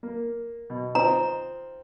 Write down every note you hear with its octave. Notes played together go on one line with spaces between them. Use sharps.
A#3
B2
C4 D#4 F4 A#5